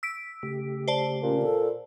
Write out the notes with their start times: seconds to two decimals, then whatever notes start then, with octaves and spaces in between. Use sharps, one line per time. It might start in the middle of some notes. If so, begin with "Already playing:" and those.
0.03 E6 B6 D7
0.43 C#3 A3 G4
0.88 C5 D5 A5
1.22 A#2 C#4
1.43 A4